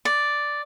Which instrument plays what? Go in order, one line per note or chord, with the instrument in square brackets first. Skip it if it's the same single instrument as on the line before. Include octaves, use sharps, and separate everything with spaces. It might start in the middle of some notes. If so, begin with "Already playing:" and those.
[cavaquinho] D5